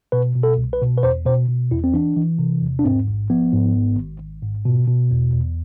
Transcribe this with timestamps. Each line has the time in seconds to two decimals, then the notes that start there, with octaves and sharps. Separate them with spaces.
0.12 B2 B4
0.36 B2
0.43 A4
0.58 C2
0.73 B4
0.81 B2
0.98 B4
1.03 E2 C5
1.26 B2 C5
1.48 B2
1.71 E2 E4
1.84 C4
1.94 E3 D4
2.16 E3
2.39 C3
2.62 E2
2.79 D4
2.85 G#2 C4
3.08 A1
3.30 F3 B3
3.53 G#2
3.75 G#1
3.97 G#1
4.20 G#1
4.42 G#2
4.65 B2
4.88 B2
5.11 E2
5.33 E2